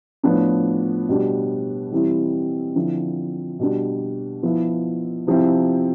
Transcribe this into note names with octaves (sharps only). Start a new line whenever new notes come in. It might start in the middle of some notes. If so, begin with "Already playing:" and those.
A2 F3 B3 D4
B2 G3 D4
E3 G3 C4 E4
D3 F3 C4 E4
B2 G3 D4
F3 B3 E4
C3 F3 C4 E4